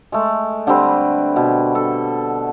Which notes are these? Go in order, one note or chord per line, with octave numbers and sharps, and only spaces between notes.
G#3 A3
D3 G3 C4 B4
B2
A4